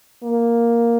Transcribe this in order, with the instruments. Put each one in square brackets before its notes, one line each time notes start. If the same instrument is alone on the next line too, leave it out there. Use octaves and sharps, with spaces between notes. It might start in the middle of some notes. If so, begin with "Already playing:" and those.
[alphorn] A#3